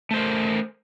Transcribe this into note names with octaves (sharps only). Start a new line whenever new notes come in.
A3 A#4 C5